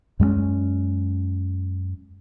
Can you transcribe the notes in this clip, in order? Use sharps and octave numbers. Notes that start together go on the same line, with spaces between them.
F#2 G#3 A#3 C#4